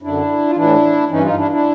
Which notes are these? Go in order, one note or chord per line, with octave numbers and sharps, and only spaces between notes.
F#2 D3 D4 E4
F4
A2 E3 D4 E4
G2 E3 C#4 D#4
D#4 F4
D4 E4
D4 E4